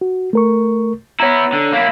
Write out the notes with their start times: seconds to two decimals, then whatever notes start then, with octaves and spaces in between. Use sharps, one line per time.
0.01 F#4
0.33 A3 A#4 C#6
1.20 B3 E4 C#5 A#5
1.53 D3
1.73 A#3 E4